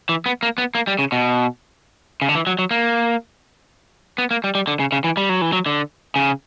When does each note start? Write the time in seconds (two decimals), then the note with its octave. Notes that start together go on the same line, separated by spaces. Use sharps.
0.09 E3
0.26 B3
0.43 A#3
0.58 B3
0.75 A#3
0.87 G3
0.99 C#3
1.12 B2
2.22 C#3
2.29 D3
2.35 E3
2.47 F#3
2.59 F#3
2.71 A#3
4.18 B3
4.31 A#3
4.44 G3
4.55 G3
4.67 D3
4.80 C#3
4.92 C#3
5.04 E3
5.17 G3
5.29 F#3
5.42 E3
5.53 F#3
5.66 D3
6.16 C#3